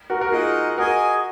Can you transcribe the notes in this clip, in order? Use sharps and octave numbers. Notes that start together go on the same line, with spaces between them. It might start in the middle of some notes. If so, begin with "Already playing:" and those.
F#4 A#4
F#4 A#4
D#4 F4 G#4 A#4 D#5 F#5
F#4 G#4 A#4 D#5 G#5